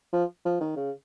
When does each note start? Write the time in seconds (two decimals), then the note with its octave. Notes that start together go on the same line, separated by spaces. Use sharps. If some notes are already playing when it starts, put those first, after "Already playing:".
0.13 F3
0.45 F3
0.60 D#3
0.76 C#3